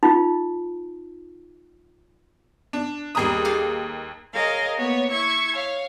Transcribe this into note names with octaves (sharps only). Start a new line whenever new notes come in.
D#4 F4
D4
D#2 G3 G#4 B4 A#5 D#6
G4 A4 F5
G#4 A#4 C#5 D#5 F5
A#3 B3 C#5
E4 C#6 G#6
C#5 F5